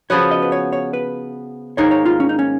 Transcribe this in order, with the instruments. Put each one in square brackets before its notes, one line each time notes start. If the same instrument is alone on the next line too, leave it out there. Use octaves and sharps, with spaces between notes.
[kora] C#3 F3 B3 F#4 [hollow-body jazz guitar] C#5
[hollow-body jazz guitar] D#5
B4
C#5
C#5
B4
[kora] G#2 D#3 A#3 [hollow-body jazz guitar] C#5
[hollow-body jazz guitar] C#5
F4
C#4
D#4
C#4